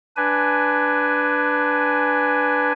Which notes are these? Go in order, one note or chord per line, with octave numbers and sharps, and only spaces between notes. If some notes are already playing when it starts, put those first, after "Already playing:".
D4 B4 G#5